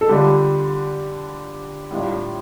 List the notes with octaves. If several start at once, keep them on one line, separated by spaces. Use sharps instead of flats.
A4
D3 G3 D4 F4 G4
A2 G3 D4 F4